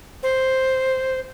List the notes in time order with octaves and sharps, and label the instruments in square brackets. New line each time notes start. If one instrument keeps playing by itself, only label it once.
[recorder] C5